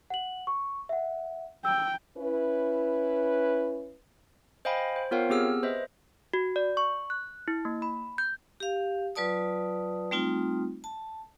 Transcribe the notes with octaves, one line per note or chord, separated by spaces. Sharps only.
F#5 F#7
C#6
E5 F#5
G5 E6
C#4 E4 B4
C5 D#5 F5 G5 G#5 B5
C5
B3 F4 A#4 C#5 F5 G5
B3 C4 G4 G#4 E6 F6
B4 C5 D#5 E5
F#4
D5
C#6
F#6
E4
A#3
B5
G6
G4 F5
F#3 F4 B4 D5 A5 D#6
G3 A3 C4 D#4 F4
A5